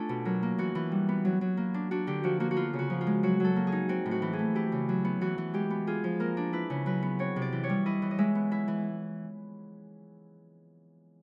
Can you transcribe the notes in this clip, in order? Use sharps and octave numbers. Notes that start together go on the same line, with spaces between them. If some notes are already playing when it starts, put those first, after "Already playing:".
Already playing: A3 C#4 D4 F4 A4
B2
F#3 A#4
A#3
E3 F#4
E3
G3
B3
F#3
F#3
A#3
D4
D4 F#4
D3 G4
F3 F#4
A#3 F#4
F#4
B3 F4
C#3
F#4
F3
F4
G#3
F#3 F#4
F#3 A4
A#3
G#4
D#4
C4 F#4
A2
F#4
E3
G#4
A3
E4 G4
C#3
F#3
B3
E3 F#4
E3
G#3 G4
B3
F4 G#4
F3
A#3 A#4
D4
E4 B4
C#3
F#3 B4
B3
C4 C#5
C3
D5
E3
C#5
G3
E4 D#5
E3
D#5
G#3 E5
B3
E4 E5
E3